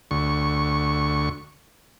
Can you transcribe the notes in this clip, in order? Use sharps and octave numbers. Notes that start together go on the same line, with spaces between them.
D2 C#6